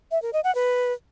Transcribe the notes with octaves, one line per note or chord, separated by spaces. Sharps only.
E5
A#4
D#5
F#5
B4